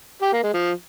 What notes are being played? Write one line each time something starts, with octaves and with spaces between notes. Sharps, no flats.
G4
A#3
G#3
F3